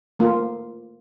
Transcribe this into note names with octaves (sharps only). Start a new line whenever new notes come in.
A3 A#3 F4